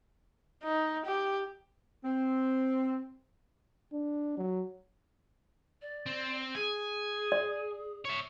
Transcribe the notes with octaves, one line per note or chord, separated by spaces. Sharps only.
D#4
G4
C4
D4
F#3
D5
C4
G#4 G#5
D5
C#5 E5